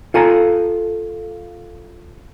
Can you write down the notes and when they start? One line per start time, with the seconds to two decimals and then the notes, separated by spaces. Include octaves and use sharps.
0.14 F4 A4 G#5 A#5